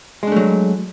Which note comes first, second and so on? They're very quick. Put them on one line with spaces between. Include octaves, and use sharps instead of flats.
G#3 D4 A3 F#3